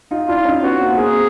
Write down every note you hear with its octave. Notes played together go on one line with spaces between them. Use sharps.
D#4 F4
D4 E4 F4
C#4 D#4
B3 C#4 F#4
A#3 C4
A#3 C4 G#4